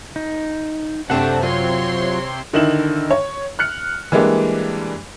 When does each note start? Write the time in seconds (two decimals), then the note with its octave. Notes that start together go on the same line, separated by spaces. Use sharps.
0.16 D#4
1.10 F#2 C3 A3 C4 D4 F#5 A5
1.42 F#3 F4 C#5 C6
2.53 D3 D#3 D#4 E4 E7 F#7
3.11 C#5
3.59 F6 F#6 C#7
4.12 E3 G3 G#3 A#3 D4